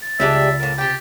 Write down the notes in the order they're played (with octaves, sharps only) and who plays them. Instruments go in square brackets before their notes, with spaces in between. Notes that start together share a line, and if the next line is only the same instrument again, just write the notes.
[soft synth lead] A6
[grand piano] C#2 A5 [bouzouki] G3 G#3 D4 [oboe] E5
[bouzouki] A2 A#3
[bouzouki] C3 G5 [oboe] G4